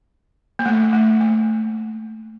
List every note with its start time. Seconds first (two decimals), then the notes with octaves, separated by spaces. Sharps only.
0.59 A#3
0.66 A3
0.93 A3
1.21 A#3